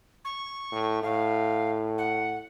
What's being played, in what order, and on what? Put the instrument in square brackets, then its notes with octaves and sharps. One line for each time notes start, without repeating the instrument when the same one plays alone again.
[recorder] C#6
[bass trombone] A2
[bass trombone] A2 [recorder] F5
[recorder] F#5